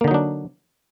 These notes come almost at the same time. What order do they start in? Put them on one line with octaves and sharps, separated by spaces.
A#3 D3 D#4 F#3 D4